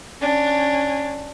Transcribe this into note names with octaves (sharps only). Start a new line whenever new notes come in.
C#4 D4